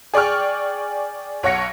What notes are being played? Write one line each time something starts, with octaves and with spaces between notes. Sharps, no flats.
G#4 D5 G5 C#6 F6
B1 C#5 F#5 A#6 C#7